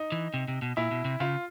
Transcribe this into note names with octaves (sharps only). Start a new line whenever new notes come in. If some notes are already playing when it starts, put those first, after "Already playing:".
Already playing: D#4
E3
C3
C3
B2
A#2 E4
B2
C3
C#3 F4